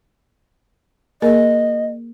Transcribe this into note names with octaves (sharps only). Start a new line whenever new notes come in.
A#3 G#4 A#4 D#5